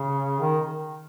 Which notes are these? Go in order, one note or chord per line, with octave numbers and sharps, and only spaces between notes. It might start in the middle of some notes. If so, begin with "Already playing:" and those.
Already playing: C#3
D#3